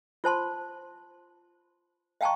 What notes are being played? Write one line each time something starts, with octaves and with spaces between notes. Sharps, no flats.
F4 C5 A5 C6
D#5 F5 G5 A5 A#5 C#6